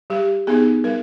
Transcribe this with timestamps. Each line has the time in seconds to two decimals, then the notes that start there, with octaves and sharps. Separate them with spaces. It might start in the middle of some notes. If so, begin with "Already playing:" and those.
0.10 G3 G4
0.47 B3 D#4 G#4
0.84 G3 A#4